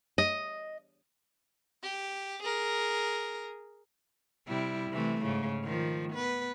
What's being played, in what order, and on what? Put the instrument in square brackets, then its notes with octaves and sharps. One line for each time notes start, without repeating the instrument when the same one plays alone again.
[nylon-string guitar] D#5
[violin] G4
G#4 A#4
[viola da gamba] C3 G3 E4
C3 E3 A3
G#2 C#3
D#3 F3
B3 B4